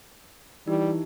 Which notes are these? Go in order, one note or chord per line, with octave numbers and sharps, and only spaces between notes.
E3 G3 D#4 E4 G4